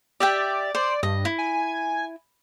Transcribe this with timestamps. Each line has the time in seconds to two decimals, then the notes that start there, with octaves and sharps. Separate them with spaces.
0.20 G4 D5 E5 G5
0.75 C5 D5
1.03 G2 D#5
1.25 E4
1.38 G#5